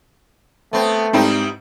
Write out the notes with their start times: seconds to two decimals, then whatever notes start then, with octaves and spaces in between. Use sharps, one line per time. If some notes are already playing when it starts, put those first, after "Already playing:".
0.73 A3 B3 C4
1.13 G#2 G3 C4 D#4 E4